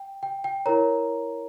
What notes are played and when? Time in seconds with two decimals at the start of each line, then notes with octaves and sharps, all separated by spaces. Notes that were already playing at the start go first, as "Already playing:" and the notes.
Already playing: G5
0.23 G5
0.44 G5
0.66 E4 A#4 C#5 A#5